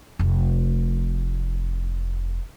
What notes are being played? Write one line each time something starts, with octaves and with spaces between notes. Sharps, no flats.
F1 A3